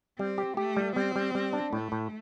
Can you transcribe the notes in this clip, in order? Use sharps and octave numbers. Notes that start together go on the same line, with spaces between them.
G3 C4
G4
A3 G4
G3
G3 C4
G3
G3
D4
A2 A3
A2